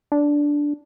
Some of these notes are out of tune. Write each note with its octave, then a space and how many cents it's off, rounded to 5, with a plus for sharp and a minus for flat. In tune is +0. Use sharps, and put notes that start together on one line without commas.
D4 -5